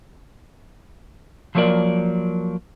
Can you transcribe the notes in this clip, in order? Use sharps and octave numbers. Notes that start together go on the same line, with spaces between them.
F3 F#3 A#3 G4 A#4 D5